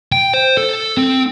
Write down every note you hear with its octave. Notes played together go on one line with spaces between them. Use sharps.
G5
C5
A4
C4